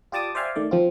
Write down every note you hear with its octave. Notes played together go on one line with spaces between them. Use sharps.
F4 G4 D5 A5 D6 D#6
C5 D5 E5 F5 G5 G#5
D#3 A3 D5
F3 C4 F4